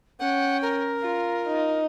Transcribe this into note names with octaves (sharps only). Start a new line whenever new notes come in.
C#4 F#5 G5
A#4
F4
D#4